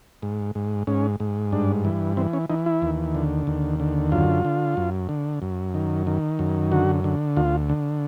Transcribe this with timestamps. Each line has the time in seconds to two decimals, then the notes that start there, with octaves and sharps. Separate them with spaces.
0.22 G#2
0.55 G#2
0.87 G#2 C#4
1.20 G#2
1.52 G2 D4
1.85 E3
2.17 E3 C4
2.33 C#4
2.50 E3 D#4
2.66 E4
2.82 D#2
3.15 D3
3.47 D#2
3.80 D3
4.12 F#2 F4
4.45 D3
4.77 F#2
5.09 D3
5.42 F#2
5.74 D#3
6.07 D#3
6.39 F#2
6.71 D3 F#4
7.04 D3
7.37 D2 F4
7.69 D3